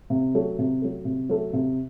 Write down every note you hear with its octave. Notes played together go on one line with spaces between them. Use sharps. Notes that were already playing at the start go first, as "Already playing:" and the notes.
C3
F#3 A3
C3
F#3 A3
C3
F#3 A3
C3